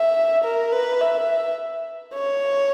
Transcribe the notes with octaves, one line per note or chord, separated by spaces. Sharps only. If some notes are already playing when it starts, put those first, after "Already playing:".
Already playing: E5
A#4
B4
E5
C#5